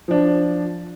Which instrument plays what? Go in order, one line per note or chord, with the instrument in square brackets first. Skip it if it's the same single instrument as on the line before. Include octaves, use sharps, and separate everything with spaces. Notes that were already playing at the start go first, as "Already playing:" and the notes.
[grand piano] F3 D4